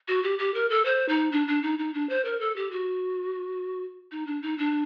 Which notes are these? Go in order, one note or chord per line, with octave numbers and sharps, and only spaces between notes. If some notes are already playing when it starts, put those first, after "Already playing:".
F#4
G4
G4
A#4
A4
C5
D#4
D4
D4
D#4
D#4
D4
C5
A#4
A4
G4
F#4
D#4
D4
D#4
D4